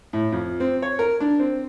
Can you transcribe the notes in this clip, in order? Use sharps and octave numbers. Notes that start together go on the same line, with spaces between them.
A2
F2
C4
C#5
A#4
D4
C4